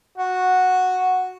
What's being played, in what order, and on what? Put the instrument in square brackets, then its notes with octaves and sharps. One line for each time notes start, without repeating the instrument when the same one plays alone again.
[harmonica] F#4